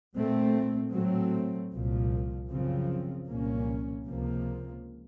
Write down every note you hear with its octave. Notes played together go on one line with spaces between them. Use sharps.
A#2 A3 C4
A2 F#3 A3 C4
C2 A#2 F3
F#2 C#3 F3 C4
C2 A#2 F3 A#3 C#4
C#2 C3 F3 A#3